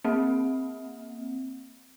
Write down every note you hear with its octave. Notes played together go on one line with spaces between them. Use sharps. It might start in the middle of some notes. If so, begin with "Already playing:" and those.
A#3 C4